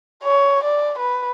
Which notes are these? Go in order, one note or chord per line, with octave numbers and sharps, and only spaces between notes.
C#5
D5
B4